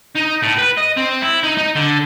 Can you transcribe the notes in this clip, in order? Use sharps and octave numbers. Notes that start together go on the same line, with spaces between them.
D#4
A2
B4
D#5
C4
E4
D#4
D#4
D3